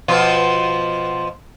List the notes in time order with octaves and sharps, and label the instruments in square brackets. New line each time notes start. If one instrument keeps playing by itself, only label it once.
[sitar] B2 F3 F4